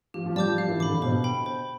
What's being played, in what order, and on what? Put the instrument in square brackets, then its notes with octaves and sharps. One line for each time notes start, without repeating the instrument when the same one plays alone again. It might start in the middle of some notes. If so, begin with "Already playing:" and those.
[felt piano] F3 [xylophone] G4
[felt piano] F3
[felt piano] G3 [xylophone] D5 A5 D6 G6
[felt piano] F3
[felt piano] F3 [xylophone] F5
[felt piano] E3
[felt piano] D3 [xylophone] B5 D6
[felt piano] D3
[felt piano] B2 [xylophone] C5
[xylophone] G5 B5
C5